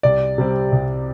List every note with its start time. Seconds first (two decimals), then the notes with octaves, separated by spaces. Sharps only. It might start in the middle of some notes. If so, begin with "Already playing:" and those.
0.03 C2 D5
0.38 C3 G3 C4
0.72 C2